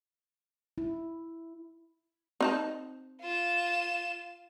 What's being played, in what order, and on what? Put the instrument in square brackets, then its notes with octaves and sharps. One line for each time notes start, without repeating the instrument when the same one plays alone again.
[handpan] E4
[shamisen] C4 D#4 A5
[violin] F4 E7